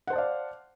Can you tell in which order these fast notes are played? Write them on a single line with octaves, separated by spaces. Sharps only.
F#5 C5 A5 D5 F5